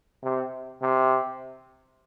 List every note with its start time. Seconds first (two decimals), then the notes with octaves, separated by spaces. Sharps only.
0.23 C3
0.82 C3